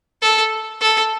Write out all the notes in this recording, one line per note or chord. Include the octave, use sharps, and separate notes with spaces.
A4
A4